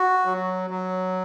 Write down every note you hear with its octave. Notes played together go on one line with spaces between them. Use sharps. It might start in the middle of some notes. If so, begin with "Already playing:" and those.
Already playing: F#4
F#3
F#3